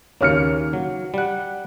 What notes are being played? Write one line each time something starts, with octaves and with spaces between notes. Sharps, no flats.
D#2 C#3 A#3 C#5 F6 C#7
F#3
G3 F#5